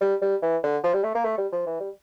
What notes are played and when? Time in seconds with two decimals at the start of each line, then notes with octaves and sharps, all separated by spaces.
0.01 G3
0.21 G3
0.42 E3
0.63 D3
0.84 F3
0.94 G3
1.04 A3
1.15 A#3
1.25 A3
1.38 G3
1.52 F3
1.66 E3
1.80 G3